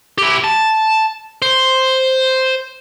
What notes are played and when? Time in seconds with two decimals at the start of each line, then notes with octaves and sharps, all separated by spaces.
0.18 E4 G4
0.44 A5
1.42 C5